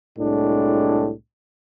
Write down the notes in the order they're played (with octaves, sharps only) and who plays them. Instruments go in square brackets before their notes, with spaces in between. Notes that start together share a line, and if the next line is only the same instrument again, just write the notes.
[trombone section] C2 A2 G#3 D4